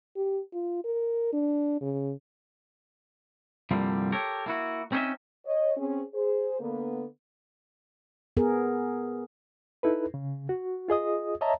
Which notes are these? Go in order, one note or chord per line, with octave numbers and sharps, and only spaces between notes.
G4
F4
A#4
D4
C#3
C2 G2 D3 F3 G3 A#3
G4 A4 A#4 C#5
A#3 E4 F#4
C4 C#4 D#4 G4 D#5 E5
C#5 D#5
C4 C#4 G#4
G#4 C5
D3 A#3 B3
B3 G#4 A#4
D#4 E4 A4 B4
C#3
F#4
F4 G#4 D#5 D#6
C#5 D#5 E5 A5 A#5